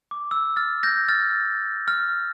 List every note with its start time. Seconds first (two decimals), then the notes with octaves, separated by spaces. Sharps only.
0.11 D6
0.31 E6
0.56 F6 A6
0.83 G6 A#6
1.08 F6 A6
1.88 F6